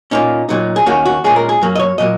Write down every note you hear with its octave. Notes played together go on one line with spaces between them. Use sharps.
A#2 A#3 C#4 D#4
A#2 F#3 D#4
G#4
D#2 D#3 A#3 C#4 F#4
F#4
A#2 G#3 C#4 G#4
A#4
G#4
F#2 F#3 A#3
D#5
C#5
A#2 F#3 A#3 D#5